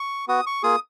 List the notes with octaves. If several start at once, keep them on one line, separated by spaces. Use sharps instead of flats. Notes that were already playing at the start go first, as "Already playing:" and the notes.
Already playing: C#6
B3 F#4 D#6
C#6
A#3 F4 G#4 D#6